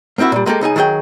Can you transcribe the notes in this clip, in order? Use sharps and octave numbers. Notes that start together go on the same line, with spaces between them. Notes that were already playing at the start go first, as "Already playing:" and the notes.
A#3 C4 D#4 E4 F#4
A#2 G3
G#3 A#3 G4 A4
C#2 D#4 G#4 G#5
D#3 F#3 G#4 F#5 G5